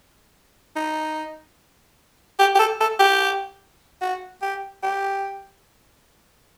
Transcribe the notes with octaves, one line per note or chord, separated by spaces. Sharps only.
D#4
G4
G4
A4
A4
G4
F#4
G4
G4